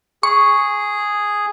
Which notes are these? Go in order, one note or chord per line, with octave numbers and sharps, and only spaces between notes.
G#4 C#6